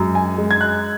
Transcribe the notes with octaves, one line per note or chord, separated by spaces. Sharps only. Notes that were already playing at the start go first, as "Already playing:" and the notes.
Already playing: F#2 G#3
G#5
G#3
G#6
F#6